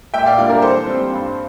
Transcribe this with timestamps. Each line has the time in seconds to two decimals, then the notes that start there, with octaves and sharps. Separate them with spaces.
0.14 A#2 E5 G5
0.26 D5 F5
0.37 G3 A#3 D4 F4 D5 F5
0.49 A#4 D5
0.62 E3 A4 C5
0.86 G3 C4
1.10 G2